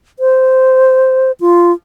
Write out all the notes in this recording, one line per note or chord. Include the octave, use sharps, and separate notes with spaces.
C5
F4